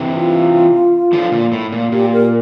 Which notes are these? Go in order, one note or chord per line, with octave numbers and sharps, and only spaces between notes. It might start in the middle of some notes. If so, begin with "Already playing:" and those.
Already playing: C3 E3
F4
D3 F3
A#2
A2
A#2
A#2 G4
A#4